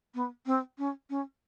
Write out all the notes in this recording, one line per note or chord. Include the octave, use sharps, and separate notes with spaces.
B3
C4
C#4
C#4